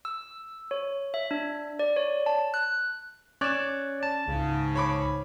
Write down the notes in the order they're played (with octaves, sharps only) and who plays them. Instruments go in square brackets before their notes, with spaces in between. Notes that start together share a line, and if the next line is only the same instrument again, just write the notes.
[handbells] E6
C#5
E5
D4
D5
C#5
A5
F#6
[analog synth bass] C#4 [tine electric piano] C#5 D5 [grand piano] F#6 E7
[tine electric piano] A5
[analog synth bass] C#2 [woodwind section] G#2 C#3
[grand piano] C#5 B5 D6